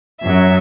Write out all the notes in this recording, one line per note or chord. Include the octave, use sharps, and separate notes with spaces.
F#2 F#3 E5